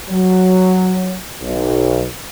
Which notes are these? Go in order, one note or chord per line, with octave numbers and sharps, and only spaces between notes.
F#3
B1